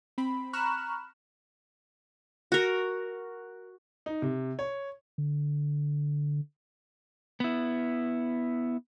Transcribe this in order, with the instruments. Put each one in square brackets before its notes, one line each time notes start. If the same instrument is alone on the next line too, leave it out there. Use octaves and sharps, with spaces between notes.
[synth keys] C4 B5
A#5 B5 C#6 F6 F#6 E7
[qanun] F#4 A#4
[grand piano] D#4
C3
C#5
[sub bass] D3
[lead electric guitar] B3 E4